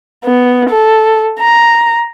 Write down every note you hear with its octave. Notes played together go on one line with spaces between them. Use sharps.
B3
A4
A#5